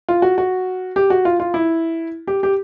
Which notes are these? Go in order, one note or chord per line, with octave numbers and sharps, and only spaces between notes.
F4
F#4
F#4
G4
F#4
F4
F4
E4
G4
G4